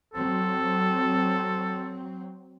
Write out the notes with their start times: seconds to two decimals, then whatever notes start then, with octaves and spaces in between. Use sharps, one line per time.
0.14 F#3 C4 A4